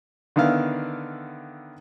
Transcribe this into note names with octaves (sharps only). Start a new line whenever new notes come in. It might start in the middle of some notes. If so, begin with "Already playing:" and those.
D3 D#3 B3 E4 F5